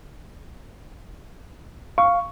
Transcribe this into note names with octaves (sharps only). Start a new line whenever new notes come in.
F5 C#6